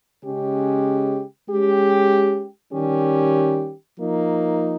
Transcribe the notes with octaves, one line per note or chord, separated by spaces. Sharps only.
C#3 G#3 C#4 G4
G#3 C#4 G4
D#3 G3 C#4 G4
F3 A#3 D#4